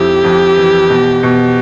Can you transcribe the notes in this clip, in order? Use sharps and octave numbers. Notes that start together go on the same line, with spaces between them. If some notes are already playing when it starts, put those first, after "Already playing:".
Already playing: F2 E4 G4
F2
E3
B2
B2